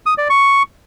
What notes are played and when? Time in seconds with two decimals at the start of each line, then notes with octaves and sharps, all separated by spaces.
0.06 D#6
0.18 D5
0.30 C#6